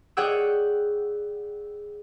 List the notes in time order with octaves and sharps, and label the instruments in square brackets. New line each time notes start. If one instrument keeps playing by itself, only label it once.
[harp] G#4 C#5 D5 F#5 G5 E6